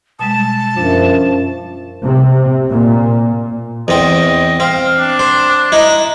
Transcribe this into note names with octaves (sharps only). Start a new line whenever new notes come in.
B2 G3 G#3 A5
F#2 F3 D4
C3
A#2
E2 C4 D#5
C4 F5
D4
C5
D#4 E4